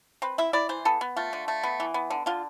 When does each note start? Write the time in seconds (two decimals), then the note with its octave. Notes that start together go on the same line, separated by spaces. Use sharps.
0.22 C4 B4
0.38 E4 E5
0.53 E4 D5
0.69 E3 C5
0.85 B3 A4
1.01 B3
1.16 A3 F4
1.33 D3
1.48 A3
1.63 B3
1.80 E3
1.94 B3
2.10 D3
2.26 D3 F4